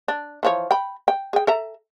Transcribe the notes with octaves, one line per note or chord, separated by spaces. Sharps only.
D4
E3 F3 C#5
G5 B5
G5
G#4 G5
A4 E5 A#5